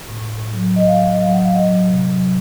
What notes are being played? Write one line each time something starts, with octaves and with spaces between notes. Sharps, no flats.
A2
A2
F#3
F#3 D#5
F5
F#3 F5
D#5
F#3 F5
F#5
F#3 F5
D#5
F#3
C3
F#3